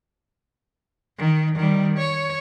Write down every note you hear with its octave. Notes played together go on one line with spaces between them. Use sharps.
D#3
D#3 G3
C#5